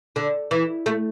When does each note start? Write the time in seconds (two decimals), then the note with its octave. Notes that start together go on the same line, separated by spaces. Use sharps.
0.16 D3
0.51 E3
0.86 A3